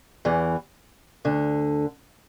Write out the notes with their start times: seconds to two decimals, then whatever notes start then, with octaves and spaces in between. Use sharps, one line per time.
0.25 E2 E3
1.25 D2 D3